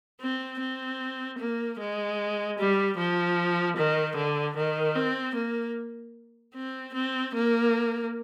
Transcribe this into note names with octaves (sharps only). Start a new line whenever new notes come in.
C4
C4
A#3
G#3
G3
F3
D#3
D3
D#3
C4
A#3
C4
C4
A#3